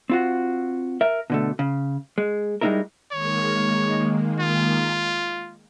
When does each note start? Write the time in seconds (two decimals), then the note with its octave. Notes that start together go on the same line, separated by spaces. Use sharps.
0.10 C4 F4 F#4
1.01 A#4 E5
1.30 B2 D3 A3
1.59 C#3
2.18 G#3
2.61 G3 G#3 A#3 D#4 E4 A#4
3.12 D#3 G#3 A#3 C#5
4.39 F4